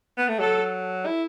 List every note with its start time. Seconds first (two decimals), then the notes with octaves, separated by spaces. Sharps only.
0.18 B3
0.29 A3
0.39 F#3 A4
1.06 E4